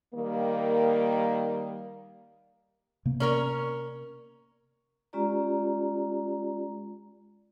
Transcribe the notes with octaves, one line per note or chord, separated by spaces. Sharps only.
D#3 G3 A#3
C3 A#3 B3
C#4 A#4 C#5
G#3 C#4 F4 G4 D5 A#5